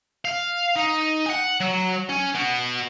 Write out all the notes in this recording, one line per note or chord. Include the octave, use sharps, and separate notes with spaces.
F5
D#4
F#5 G#5
F#3
C#4
B3 F#4